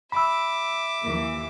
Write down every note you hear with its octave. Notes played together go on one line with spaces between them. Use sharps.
E5 B5 D6 E6
D#2 E3 A#3